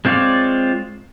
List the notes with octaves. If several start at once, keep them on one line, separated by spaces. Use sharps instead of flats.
G#3 C4 F4 C#5 D5